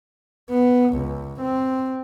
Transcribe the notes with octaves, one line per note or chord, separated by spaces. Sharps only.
B3
C#2
C4